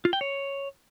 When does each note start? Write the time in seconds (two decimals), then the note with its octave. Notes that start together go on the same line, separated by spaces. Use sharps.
0.05 F4
0.13 G5
0.21 C#5